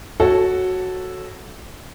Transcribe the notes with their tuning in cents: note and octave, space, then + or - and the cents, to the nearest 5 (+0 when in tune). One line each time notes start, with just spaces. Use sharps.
F#4 +0 A4 +0 C#5 -15